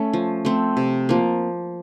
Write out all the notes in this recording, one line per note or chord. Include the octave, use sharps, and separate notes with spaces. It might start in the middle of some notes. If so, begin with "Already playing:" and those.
Already playing: A3 C#4
F3
A3 C4
C3
F3 A#3